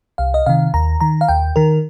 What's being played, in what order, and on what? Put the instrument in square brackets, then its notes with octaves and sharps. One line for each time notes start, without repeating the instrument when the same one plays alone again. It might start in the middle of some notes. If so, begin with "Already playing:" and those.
[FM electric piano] C2 F5
D#5
C3 D#3 F5
D#2 A#5
D#3 A#5
F5
D#2 G5
D#3 A#4